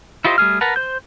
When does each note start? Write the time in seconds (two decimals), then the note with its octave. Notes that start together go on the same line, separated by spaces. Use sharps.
0.25 E4 F4 G4 C5 D#5
0.38 G3 A3 G#4 F6
0.61 A#4 B4 F#5 A5 A#5
0.76 C5 G6